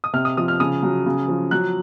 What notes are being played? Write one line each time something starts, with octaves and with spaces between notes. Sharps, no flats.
D#6
C3 F6
D#6
F3 D#6
F6
C#3 D#6
F#3
C#3
F3
F#3 F#6